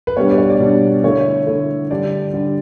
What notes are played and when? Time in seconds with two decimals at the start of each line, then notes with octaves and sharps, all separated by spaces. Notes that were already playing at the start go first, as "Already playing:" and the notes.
0.07 B4
0.17 B2 G3 D4 C#5
0.31 D5
0.38 C#5
0.50 D5
0.60 B2 G3 D4
1.04 D3 A3 E4 C#5
1.46 D3 A3 E4
1.91 D3 G3 D4 D5
2.33 D3 G3 D4